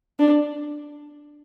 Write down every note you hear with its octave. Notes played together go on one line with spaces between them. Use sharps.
D4